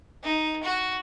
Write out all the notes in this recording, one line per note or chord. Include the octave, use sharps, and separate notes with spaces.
D#4
F#4